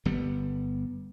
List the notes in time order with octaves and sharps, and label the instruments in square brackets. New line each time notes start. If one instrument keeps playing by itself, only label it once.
[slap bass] G1 G3 B3